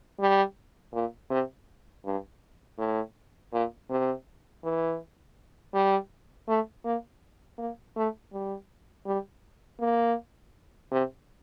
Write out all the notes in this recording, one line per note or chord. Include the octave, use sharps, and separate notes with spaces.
G3
A#2
C3
G2
A2
A#2
C3
E3
G3
A3
A#3
A#3
A3
G3
G3
A#3
C3